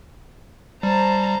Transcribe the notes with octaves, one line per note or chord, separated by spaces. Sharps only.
G3 C5 A5 A#5